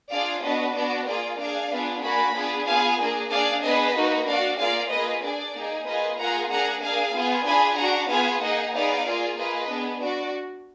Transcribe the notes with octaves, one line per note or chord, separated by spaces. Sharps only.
D4 F4 G#4 D5 F5
B3 D4 F#4 B4 D#5
B3 D4 F#4 D5
A#3 F4 G#4 D5
D4 G#4 D5 F5
B3 D4 F4 G#4
A#3 D4 F#4 G#5 B5
B3 D4 F4 G#4
B3 F4 G#4 F5 G#5
A#3 D4 G#4
D4 G#4 D5 F5
B3 D4 G#4 B4 D#5
A#3 D#4 F#4
D4 F#4 D5 F5
A#3 F4 G#4 D5 F5
A#3 F4 G#4 B4 D#5
D4 G#4 D5
A#3 D#4 G#4
A#3 F4 G#4 B4 D#5
A#3 F4 G#4 F#5 A#5
A#3 D4 G#4 F#5 A#5
A#3 D4 G#4 F5 G#5
B3 F4 G#4
D4 F4 G#4 G#5 B5
D4 F#4 F#5 A#5
B3 F4 G#4 F5 G#5
A#3 D#4 G#4 D#5 F#5
B3 D#4 G#4 D5 F5
A#3 F4 G#4
A#3 F4 G#4 B4 D#5
B3 D4 G#4
D4 F#4 D5